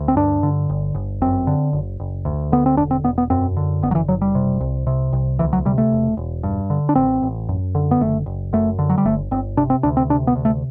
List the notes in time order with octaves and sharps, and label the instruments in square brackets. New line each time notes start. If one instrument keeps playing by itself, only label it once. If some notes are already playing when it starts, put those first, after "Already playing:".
Already playing: [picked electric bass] D2
C4
G2 D4
D3
G1
G1
F#2 C4
D3
F#1
F#1
D2
D3 B3
C4
E1 D4
C4
E1 B3
B3
F#2 C4
D3
F#1 B3
F#3
E3
F#1 F#3
G3
C3
C2
C3
C2
D2 E3
F#3
C3 G3
A3
E1
E1
G2
D3
D4
A1 C4
A1
F#2
D3
B3
F#1 A3
F#1
F#2 A3
D3
F#3
G3
G1 A3
G1 C4
C3 D4
C4
D2 D4
C4
C3 D4
B3
D2
A3